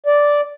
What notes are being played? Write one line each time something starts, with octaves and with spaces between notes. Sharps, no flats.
D5